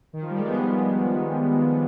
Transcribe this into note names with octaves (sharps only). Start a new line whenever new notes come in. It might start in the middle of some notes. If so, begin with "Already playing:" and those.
D#3
F3
G3
G#3
G3 B3